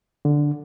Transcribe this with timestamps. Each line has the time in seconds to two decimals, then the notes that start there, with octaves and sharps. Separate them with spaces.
0.25 D3